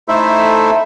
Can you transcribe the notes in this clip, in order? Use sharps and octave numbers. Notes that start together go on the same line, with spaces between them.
A3 D#4 E4 A4 C5 E5